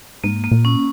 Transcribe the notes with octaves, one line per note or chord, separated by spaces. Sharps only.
G#2 A#3
A#3
A#2
C#4